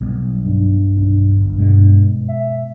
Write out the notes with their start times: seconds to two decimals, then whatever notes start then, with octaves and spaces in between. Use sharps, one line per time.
0.01 B1 G3 B3
0.44 G2
0.97 B1 D4
1.36 G1
1.58 B2 G#3
2.28 E5